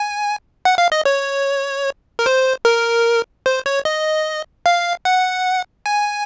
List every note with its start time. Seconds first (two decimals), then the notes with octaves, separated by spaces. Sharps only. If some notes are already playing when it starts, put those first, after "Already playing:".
Already playing: G#5
0.65 F#5
0.78 F5
0.92 D#5
1.05 C#5
2.19 A#4
2.26 C5
2.65 A#4
3.46 C5
3.66 C#5
3.85 D#5
4.66 F5
5.05 F#5
5.86 G#5